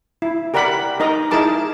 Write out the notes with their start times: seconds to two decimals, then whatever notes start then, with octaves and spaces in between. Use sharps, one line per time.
0.22 E4
0.54 G4 A#4 D5 F#5 B5
1.00 D#4 A#4 D#5 A#5
1.31 D#4 E4 G#4 A#4 A5 D6